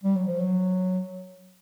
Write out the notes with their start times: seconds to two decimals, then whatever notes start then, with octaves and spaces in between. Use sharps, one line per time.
0.03 G3
0.15 F#3
0.27 F3
0.40 F#3